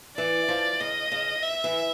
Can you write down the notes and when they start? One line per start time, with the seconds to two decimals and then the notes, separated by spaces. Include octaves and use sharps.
0.17 E3 D5
0.49 F3
0.80 C#3 D#5
1.12 C#3
1.43 E5
1.64 E3